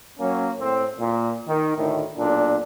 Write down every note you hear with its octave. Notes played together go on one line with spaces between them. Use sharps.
F#3 A#3 C#4
A2 C4
A#2
D#3
D2 A2 D#3
B1 A#2 D4